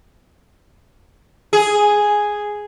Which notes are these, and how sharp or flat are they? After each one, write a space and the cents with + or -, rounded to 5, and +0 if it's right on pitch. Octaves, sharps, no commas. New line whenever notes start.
G#4 +0